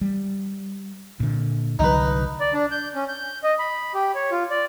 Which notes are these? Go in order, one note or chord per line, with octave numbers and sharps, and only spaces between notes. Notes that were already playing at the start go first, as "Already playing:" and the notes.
G3
A#2 D3
C2 D3 F#3 D#4 B4
D5
D4
G6
C#4
G6
D#5
B5
G4
C#5
F4
D5